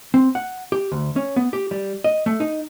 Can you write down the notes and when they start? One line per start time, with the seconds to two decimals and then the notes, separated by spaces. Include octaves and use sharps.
0.14 C4
0.35 F#5
0.72 G4
0.92 D2
1.16 C#4
1.36 B3
1.53 G4
1.71 G3
2.04 D#5
2.26 A3
2.40 D#4